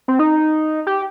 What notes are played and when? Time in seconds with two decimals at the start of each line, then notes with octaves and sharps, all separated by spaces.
0.08 C4
0.19 D#4
0.87 G4